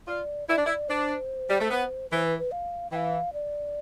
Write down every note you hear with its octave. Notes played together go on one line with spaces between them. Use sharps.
F4 D5
E4 D5
D4
E4
D4 C5
G3
A3
B3
E3 C5
B4
B4
F5
E3 F5 G5
D5